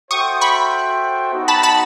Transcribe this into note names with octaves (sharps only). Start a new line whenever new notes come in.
F#4 A4 C5 E5 G5 C#6 D#6
B5 C#6
B3 D#4 F#4
A5 B5
A5 B5